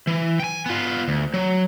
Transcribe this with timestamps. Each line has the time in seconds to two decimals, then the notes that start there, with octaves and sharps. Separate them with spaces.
0.07 E3
0.40 G5 G#5
0.66 B3 F4
1.08 D2
1.34 F#3